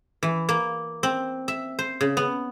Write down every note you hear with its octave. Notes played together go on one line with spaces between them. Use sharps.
E3
A#3
C4
E5
C5
C#3
B3